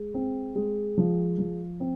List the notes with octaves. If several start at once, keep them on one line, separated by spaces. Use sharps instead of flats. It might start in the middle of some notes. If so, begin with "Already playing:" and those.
Already playing: G#3
C4
G#3
F3
F3
C4